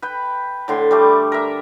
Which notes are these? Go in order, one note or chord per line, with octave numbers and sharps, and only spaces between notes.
B4 G5
A2 D3 C6
G3 A3 D6
A#4 E5